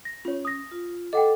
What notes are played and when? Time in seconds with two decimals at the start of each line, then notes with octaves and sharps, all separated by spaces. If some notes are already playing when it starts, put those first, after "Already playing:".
0.05 A#6
0.25 C#4 F4 C#5
0.45 D#6 A#6
0.71 F4
1.13 A4 D#5 F#5 G5 D6